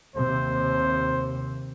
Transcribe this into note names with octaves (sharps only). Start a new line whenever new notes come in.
D#2 C3 C5